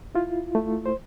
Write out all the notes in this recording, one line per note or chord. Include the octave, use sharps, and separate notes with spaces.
E4 F4
A3
C5